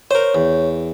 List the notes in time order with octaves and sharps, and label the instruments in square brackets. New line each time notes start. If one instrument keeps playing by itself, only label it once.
[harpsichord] A#4 C5 [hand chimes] C#5
[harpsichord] E2